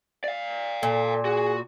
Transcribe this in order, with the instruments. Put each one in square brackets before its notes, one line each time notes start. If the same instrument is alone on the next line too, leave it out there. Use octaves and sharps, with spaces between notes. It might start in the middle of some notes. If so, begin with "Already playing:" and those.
[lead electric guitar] D5 F5
[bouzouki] A#2 [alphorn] A4
[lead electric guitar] F#4 [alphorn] G#4